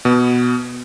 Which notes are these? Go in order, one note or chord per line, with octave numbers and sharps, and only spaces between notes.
B2 B3